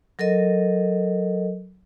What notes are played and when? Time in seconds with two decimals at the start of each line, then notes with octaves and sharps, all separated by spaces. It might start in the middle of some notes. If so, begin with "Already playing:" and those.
0.19 F#3 A4 A#4 D#5